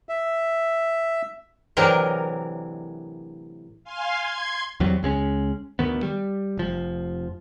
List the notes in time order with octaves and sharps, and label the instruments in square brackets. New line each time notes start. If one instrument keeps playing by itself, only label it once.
[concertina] E5
[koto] A2 C3 E3 F#3 D4 A#4
[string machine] F5 G#5 C6
C6 G#6
[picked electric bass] E2 F#3 G3 C4
C#2 G#3 C4 C#4
D2 D#3 B3
G3
F1 F3